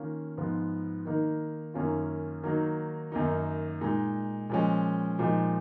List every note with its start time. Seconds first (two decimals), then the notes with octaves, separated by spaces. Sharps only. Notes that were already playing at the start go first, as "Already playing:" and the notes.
Already playing: D#3 A#3 C#4 F4
0.37 G#2 F3 B3 F4
1.05 D#3 A#3 D#4
1.74 F#2 D#3 A#3 C#4 F4
2.43 D#3 F#3 A#3 D#4
3.12 F#2 D#3 A#3 D#4
3.81 A#2 G#3 D#4
4.50 A#2 F3 G#3 C#4
5.19 A#2 F3 G#3 D#4